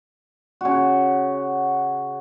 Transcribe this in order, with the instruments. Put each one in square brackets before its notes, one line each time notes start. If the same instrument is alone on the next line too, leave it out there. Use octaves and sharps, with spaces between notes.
[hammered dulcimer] C#3 F#4